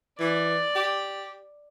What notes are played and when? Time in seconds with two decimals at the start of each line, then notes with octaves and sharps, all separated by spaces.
0.20 E3 D5
0.76 G4